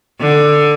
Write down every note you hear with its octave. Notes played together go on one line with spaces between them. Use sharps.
D3